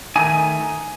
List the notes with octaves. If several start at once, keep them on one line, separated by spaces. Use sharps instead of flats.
D#3 A3 D#4 G#5